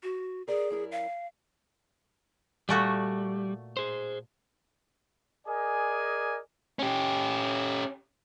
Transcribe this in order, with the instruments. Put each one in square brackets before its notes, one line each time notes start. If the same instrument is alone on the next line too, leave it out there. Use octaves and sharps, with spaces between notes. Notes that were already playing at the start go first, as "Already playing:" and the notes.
[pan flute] F#4
[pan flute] G#4 [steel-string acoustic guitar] A#4 D5
[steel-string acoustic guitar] F#2 E4 A#4
[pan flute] F5
[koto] A#2 A3 F#4 [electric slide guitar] G3
[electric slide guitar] G#4 C5
[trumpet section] G#4 A#4 D5 D#5 G#5
[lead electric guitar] C#4 G4